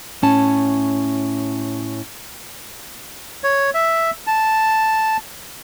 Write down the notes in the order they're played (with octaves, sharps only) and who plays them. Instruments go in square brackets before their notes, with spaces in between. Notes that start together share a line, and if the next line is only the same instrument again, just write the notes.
[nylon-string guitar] A2 C#4 A5
[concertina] C#5
E5
A5